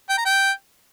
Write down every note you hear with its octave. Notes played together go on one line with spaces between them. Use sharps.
G5
A#5
G5